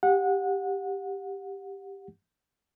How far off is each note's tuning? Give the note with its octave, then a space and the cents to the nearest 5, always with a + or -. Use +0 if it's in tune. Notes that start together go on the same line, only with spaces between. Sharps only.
G4 +5 F#5 -25